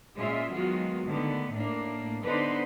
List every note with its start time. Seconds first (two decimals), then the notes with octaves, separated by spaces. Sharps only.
0.16 A#2 G#3 C#4 F4 G#4 E5
0.53 D#3 F#3 G#3 B3 F4 F#4
1.07 D3 D#3 A3 B3
1.52 A2 A#3 D4
2.24 D3 B3 D#4 B4 C5 D5